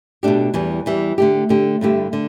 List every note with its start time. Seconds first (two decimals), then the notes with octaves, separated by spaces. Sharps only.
0.23 B2 A3 D4 G4
0.54 E2 E3 G3
0.86 E2 E3 G3
1.18 D3 A3 G4
1.49 D3 A3 G4
1.81 G2 D3 A3 E4 G4
2.13 D3